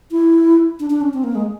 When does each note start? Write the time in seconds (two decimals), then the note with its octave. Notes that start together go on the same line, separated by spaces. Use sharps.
0.11 E4
0.80 D4
0.90 D4
1.01 C#4
1.14 C4
1.24 A#3
1.35 G#3